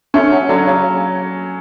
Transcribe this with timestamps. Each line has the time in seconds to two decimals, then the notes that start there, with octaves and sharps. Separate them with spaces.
0.14 A3 C#4
0.32 F#3
0.49 D3 F#3
0.66 C#3